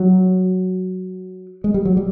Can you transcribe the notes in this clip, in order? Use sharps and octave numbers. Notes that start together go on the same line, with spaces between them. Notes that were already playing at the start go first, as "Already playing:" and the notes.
Already playing: F#3
G#3
G3
F#3
G3